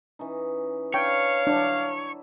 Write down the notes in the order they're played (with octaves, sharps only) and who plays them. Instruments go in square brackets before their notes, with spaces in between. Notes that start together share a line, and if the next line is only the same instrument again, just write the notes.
[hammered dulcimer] E3 C#4 D#4
[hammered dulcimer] D4 B4 [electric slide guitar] C#5 [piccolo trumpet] F5 [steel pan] G5
[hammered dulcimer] F#3 E4 [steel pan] D4